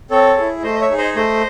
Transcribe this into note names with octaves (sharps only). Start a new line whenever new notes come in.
C4 A4 C#5
E4 G#4
A3 C5 D#5
D#5
C#5 E5
D#4 G#4
C5 D#5
A3 C5 D#5